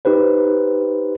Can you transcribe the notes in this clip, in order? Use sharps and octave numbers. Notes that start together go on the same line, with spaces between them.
D#4 G4 B4 C5